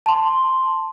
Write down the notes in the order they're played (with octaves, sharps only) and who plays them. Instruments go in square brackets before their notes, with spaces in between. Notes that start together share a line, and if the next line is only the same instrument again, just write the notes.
[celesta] A5 C6